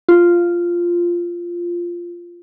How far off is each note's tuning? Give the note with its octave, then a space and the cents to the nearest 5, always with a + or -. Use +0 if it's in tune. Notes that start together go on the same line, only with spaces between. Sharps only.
F4 -5